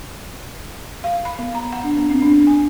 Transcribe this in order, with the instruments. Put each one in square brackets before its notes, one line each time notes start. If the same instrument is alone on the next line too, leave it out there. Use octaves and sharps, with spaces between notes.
[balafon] F5
B5
B3
A#5
F#5
D4
B3
C4
D4
G#5